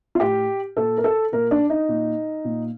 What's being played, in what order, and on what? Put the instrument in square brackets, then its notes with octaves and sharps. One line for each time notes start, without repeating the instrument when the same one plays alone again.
[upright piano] F4
A2 G4
A#2 A4
A#4
A4
A#2 A#4
D4
D#4
A#2
A#2